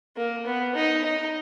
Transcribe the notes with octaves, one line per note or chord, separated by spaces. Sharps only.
A#3
B3
D#4
D#4